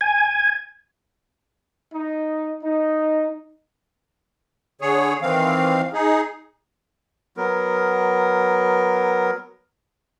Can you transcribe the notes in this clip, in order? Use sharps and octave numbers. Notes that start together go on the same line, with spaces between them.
G#5
D#4
D#4
D3 G#4 C#5
D#3 E3 C4 F5
D#4 G#4
F#3 B3 A#4